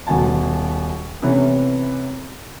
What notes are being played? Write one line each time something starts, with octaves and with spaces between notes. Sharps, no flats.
D#1 B2 G#5 A5
C3 E3 A3 B3 C#4